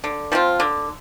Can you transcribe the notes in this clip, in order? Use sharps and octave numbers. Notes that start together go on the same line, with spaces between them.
D3
F3 C4 F4
D3